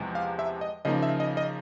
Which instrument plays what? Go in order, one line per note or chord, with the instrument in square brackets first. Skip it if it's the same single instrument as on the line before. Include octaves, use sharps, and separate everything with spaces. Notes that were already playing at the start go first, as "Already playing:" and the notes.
Already playing: [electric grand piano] E2 C3 F3 G#3
F5
E5
D#5
C#3 F3 A#3 D#4 D#5
E5
D#5
D#5